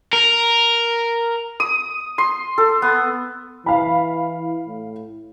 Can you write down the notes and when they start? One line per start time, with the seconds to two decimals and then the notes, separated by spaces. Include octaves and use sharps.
0.13 A#4
1.60 D#6
2.18 C6
2.58 A4
2.82 B3
3.66 E3 F5 B5
4.67 A2